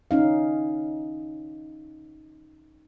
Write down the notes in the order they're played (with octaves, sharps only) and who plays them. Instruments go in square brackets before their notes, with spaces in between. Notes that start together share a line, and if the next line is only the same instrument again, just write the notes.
[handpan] C#4 D#4 F5